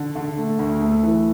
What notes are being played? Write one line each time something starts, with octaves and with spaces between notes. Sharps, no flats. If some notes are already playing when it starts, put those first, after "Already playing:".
Already playing: D3
D3
A3
D2
A3
E3